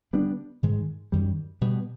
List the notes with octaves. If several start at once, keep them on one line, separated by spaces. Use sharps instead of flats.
D3 G3 B3 D4
G#2 D#3 G#3
F#2 D#3 G3
B2 G3 B3